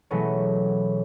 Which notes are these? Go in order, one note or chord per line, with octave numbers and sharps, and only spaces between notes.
B2 E3 F#3 G#3 A3 C#4